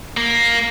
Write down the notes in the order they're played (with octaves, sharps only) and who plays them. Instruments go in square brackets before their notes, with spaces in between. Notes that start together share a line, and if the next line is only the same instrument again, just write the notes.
[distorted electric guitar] A#3